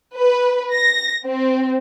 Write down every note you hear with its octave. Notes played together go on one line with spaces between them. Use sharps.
B4
A#6
C4